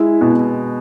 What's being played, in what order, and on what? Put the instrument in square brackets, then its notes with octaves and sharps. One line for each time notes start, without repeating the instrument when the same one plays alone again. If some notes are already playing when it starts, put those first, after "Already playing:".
Already playing: [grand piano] G#3 [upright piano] E4
[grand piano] B2